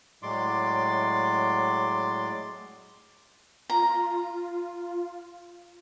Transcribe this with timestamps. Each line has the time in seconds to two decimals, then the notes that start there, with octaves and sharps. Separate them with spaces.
0.23 A2 F#3 G#3 D5 C6 D6
3.70 F4 A#5